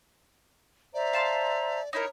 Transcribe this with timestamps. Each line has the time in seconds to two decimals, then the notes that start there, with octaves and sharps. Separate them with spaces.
0.94 C5 D5 E5 A#5
1.13 F5 A5 C6
1.93 D#4 E4 A#4 C#5